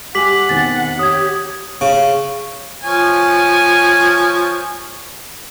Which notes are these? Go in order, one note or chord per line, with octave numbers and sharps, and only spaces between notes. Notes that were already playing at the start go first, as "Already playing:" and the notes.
G3 F#5 G#5 D6 B6 F#7
B2 D#3 C4 G#5 A6
G4 C#5 D#6 G#6
C#3
F3 C#5 G#5